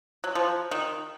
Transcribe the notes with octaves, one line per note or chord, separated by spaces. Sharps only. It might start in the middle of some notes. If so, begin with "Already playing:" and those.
F#3
F3
D#3